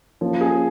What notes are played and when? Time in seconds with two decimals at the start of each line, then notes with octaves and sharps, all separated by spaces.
0.21 F3 A#3 C#4
0.41 G#4